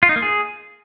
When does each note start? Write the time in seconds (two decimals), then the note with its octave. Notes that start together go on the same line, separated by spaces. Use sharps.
0.03 F4
0.09 D#4
0.16 A#3
0.22 G#4